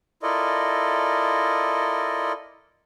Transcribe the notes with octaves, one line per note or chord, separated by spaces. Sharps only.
E4 F4 A4 A#4 D5 D#5